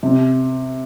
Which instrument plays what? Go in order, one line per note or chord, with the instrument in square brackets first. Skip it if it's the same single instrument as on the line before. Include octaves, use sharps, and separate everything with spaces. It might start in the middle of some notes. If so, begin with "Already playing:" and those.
[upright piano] C3